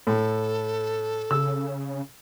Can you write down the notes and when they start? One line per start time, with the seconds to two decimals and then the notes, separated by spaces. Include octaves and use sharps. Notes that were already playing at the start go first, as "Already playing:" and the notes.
0.07 A2 A4
1.31 C#3 E6